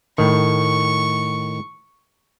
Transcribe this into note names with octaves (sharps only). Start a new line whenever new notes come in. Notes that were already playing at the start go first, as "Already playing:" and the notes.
A2 D#3 C#6